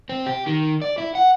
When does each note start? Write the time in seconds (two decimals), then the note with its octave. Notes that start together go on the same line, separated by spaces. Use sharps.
0.09 C4
0.26 G4
0.46 D#3
0.82 D5
0.98 E4
1.15 F#5